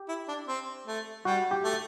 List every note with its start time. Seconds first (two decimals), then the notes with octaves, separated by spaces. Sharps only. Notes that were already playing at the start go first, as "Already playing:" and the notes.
Already playing: G4
0.09 E4
0.28 D4
0.47 C4
0.87 A3
1.25 G3 F#4
1.51 G4
1.64 A3